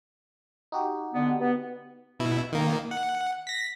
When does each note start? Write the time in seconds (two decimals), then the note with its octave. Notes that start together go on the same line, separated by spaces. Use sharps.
0.72 D#4 F#4 G4
1.14 D3 B3
1.40 B3
2.20 B2 E4
2.53 D#3 A#3
2.91 F#5
3.47 A#6 B6